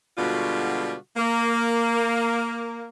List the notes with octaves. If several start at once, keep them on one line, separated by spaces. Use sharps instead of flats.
B2 D3 G3 G#3 F4 F#4
A#3